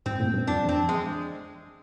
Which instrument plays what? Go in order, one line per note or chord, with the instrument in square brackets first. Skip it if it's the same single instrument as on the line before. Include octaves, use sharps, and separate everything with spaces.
[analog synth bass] G#2 [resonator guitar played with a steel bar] C4
[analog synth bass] A#2
G2
[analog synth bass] F2 [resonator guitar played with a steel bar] D4
[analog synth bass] F2 [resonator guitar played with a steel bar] C4
[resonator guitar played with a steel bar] G#3